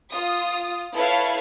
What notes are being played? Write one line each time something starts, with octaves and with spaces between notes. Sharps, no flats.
F4 D#6
E4 A4 B4 C#5 E5 F5